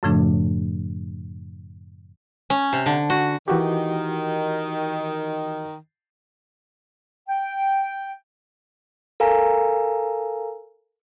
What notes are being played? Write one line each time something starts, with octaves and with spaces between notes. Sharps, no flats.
F#2 A2 C#3 F3 A3 D4
C#4
C3
D3
F#4
D#3 E3 F#4 G4
G5
A4 A#4 F5 G#5 A#5